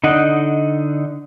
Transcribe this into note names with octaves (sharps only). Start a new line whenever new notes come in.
D3 D#4 D#5 F#5